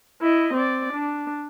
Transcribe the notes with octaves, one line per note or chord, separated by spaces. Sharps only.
E4 D#5
C4 D5
D4